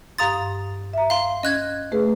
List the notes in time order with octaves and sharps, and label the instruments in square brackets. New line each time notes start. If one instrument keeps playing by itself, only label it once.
[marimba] G2 F5 C6 [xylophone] A#5 D#6 A6
[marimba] E5 A#5
[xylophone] F5 C6
[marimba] C#4 [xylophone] D#5 F#6 G#6
[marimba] A3 G#4 B4